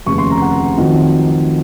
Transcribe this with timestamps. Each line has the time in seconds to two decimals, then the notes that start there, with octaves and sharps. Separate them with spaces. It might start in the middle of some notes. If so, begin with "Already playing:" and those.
0.06 F1 D#2 C#3 C#6
0.18 C6
0.30 A#5
0.42 F#5
0.77 F2 D#3 F#3